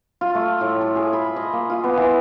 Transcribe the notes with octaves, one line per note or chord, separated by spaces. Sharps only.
F4
A3
A2
A4
G#4
B5
D#5
A#3
F4
B3
E3